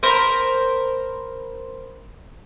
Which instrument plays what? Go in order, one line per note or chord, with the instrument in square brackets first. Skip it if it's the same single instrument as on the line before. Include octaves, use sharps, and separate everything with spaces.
[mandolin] A#4 C5 B5